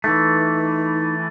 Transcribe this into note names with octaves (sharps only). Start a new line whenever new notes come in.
E3 A3 D#4